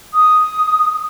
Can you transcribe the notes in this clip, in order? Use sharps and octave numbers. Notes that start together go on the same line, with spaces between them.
D#6